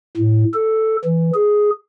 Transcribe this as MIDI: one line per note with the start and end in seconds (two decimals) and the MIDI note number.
0.17 0.44 45
0.54 0.97 69
1.05 1.31 52
1.35 1.71 68